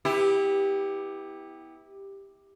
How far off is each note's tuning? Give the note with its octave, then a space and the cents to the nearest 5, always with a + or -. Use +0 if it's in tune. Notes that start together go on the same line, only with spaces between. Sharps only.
B3 -5 E4 -25 G4 +10